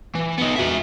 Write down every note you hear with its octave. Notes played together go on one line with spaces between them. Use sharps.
E3
B3 D#4
F#4 E5